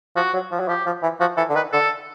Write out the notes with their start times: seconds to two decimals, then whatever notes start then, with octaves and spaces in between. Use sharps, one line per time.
0.16 F3 F#4
0.34 F#3
0.51 F3
0.60 F#3
0.68 F3 G4
0.86 F3
1.03 E3
1.20 F3 F#4
1.37 E3 A4
1.50 D3
1.55 D#3 B4
1.73 D3 A4